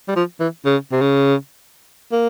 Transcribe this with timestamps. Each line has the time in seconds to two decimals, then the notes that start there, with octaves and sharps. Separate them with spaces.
0.08 G3
0.16 F3
0.40 E3
0.65 C#3
0.92 C3
1.02 C#3
2.12 A#3